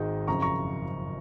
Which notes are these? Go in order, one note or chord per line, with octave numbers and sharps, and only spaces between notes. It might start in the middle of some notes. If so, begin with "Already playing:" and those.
Already playing: G#1 G#2 D#3 G#3 D#4
F#1 F2 C#3 A#5 C#6
A#5 C#6